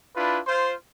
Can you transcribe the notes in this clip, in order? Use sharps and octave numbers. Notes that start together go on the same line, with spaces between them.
D4 E4 F4 B4
F4 C5